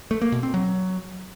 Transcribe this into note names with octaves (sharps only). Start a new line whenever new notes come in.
A3
A#3
B2
C4
F#3